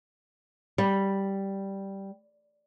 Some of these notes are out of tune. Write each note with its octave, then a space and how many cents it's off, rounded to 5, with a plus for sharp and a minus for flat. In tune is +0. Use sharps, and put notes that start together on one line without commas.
G3 -5